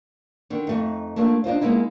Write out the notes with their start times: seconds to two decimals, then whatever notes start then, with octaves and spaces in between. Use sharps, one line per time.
0.50 D3 D#3
0.67 F2 A3 D#4
1.16 A3 A#3 D4 F4
1.44 D4 D#4 F4 C5
1.61 G#3 A#3 B3 D#4 E4